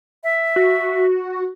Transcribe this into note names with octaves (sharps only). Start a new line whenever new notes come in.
E5
F#4